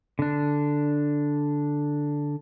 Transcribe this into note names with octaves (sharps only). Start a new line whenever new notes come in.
D3 D4